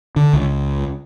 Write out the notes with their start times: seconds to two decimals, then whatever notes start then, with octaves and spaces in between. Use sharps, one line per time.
0.16 D3
0.33 C#2